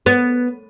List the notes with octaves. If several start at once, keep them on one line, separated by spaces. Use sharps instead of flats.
B3